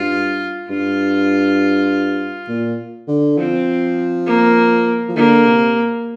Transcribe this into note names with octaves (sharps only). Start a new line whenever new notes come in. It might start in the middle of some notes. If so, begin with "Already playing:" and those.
Already playing: G2 F4
G2 F4
A#2
D3
F3 C4
A#3
F3
D3 A#3
C3